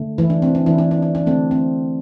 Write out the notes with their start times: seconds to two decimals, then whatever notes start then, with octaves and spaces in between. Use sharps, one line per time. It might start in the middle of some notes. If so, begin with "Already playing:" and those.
Already playing: D3 A3
0.18 E3 E4
0.30 D4
0.42 C4
0.55 D4
0.66 E3 E4
0.78 D4
0.91 D4
1.02 D4
1.15 D4
1.26 D3 A3 C4
1.51 C4